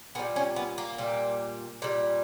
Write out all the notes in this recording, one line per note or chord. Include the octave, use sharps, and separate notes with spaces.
A#2 G3 B3
C#4
B3
A#3
A#2 G3
A#2 G3